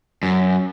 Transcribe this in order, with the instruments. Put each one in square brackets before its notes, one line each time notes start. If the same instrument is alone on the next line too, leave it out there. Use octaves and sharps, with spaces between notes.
[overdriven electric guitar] F#2